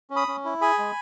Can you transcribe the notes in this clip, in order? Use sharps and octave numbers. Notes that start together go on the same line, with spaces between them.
C#4
B5 D#6
C#4
E4
G#4 G#5 B5
G#3